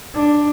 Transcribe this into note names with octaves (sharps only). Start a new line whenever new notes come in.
D4